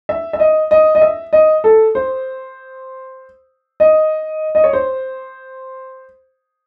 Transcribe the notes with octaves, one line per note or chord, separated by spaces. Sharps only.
E5
E5
D#5
D#5
D#5
E5
D#5
A4
C5
D#5
D#5
C#5
C5